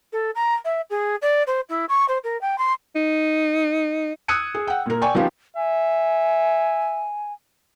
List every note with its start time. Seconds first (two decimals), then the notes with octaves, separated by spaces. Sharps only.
0.12 A4
0.35 A#5
0.64 E5
0.90 G#4
1.22 D5
1.47 C5
1.69 E4
1.89 C#6
2.08 C5
2.24 A#4
2.41 G5
2.58 C6
2.96 D#4
4.28 D#6 E6 F#6 G#6 C#7 D#7
4.54 G#4
4.67 F#5 G5
4.86 A#2 A#4
5.01 D5 G5 G#5 C#6
5.15 F3 B3 C#4 D#4 F4 G4
5.57 E5 G#5